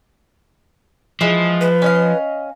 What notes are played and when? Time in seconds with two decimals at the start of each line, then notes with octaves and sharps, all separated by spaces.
1.21 E3 F3 G#3
1.61 B4
1.82 C#4 D#5 F5